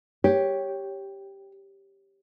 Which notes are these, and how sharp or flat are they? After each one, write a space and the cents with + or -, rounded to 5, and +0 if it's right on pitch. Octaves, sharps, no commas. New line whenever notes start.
G4 +0 C#5 +0